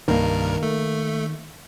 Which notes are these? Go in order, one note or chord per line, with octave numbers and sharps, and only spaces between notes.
C2 G2 D#3 A#3 A#4
A3